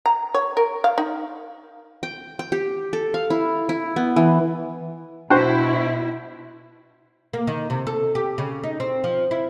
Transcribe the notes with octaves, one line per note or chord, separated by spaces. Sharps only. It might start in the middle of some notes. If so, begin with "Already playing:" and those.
A#5
C#5
A#4
F5
D#4
G5
G5
G4
A4
F5
E4
E4
B3
E3
B2 D4 E4 F#4 C5 G5 F#6
A#3
D#3
C3
A4
G4
C#3
D#4
C4
F3
E4